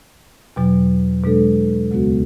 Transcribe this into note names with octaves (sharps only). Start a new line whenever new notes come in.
E2 B2 F#3
B2 G#3 D4 A4
D2 C#3 G#3 B3 F#4